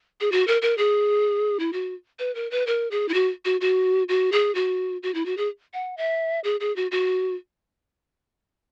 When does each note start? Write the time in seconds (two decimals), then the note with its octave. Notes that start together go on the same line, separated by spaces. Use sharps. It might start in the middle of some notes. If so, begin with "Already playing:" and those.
0.21 G#4
0.32 F#4
0.47 A#4
0.62 A#4
0.78 G#4
1.59 E4
1.73 F#4
2.19 B4
2.35 A#4
2.51 B4
2.67 A#4
2.91 G#4
3.09 E4
3.14 F#4
3.45 F#4
3.61 F#4
4.09 F#4
4.32 G#4
4.55 F#4
5.03 F#4
5.14 E4
5.26 F#4
5.37 G#4
5.74 F#5
5.97 E5
6.44 G#4
6.60 G#4
6.76 F#4
6.91 F#4